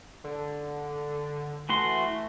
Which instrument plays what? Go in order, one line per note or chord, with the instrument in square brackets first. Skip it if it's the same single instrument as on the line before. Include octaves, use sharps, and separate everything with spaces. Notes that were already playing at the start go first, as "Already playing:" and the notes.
[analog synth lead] D3
[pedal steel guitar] E3 F#4 C6 [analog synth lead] A3